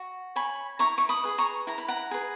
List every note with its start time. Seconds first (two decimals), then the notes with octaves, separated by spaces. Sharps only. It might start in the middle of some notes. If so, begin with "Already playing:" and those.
Already playing: F#4
0.36 C#5 G#5 B5
0.79 E4 A#5 C#6
0.98 C#6
1.09 B5 D#6
1.24 G#4 B4
1.38 A#5 C#6
1.67 E4 A#5
1.78 B5
1.88 F#5 A#5
2.11 G#4 B4